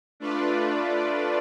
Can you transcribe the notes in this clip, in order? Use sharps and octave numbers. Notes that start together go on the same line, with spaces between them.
A3 D4 F4 B4 D5